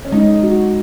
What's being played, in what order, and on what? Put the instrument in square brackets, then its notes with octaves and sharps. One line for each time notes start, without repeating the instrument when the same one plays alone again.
[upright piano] C#4
[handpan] G#3 [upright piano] D#4
[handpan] F#4